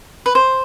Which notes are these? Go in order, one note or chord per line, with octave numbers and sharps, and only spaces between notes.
B4
C5